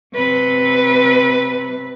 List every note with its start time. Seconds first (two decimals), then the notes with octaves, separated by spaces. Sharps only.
0.14 C3 B4